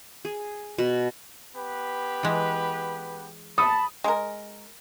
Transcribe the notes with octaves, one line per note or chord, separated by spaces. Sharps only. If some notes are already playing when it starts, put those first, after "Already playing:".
G#4
B2
B3 G4 B4
E3 G#3
A4 A5 B5 D#6
G#3 A#4